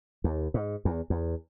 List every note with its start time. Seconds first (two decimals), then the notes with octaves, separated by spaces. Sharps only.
0.24 D#2
0.54 G#2
0.85 E2
1.10 E2